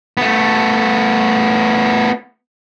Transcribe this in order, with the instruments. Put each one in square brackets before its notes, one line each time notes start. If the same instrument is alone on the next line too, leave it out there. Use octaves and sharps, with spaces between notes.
[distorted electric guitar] A3 B3